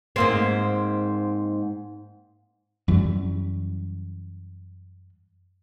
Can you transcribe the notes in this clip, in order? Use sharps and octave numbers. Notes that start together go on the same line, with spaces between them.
G#2 A#3 C4
F#2 E3 G3